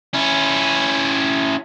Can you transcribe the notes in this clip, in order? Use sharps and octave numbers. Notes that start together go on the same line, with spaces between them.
C#4 E4